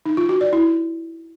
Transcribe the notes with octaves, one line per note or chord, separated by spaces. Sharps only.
D#4
F4
F#4
D5
E4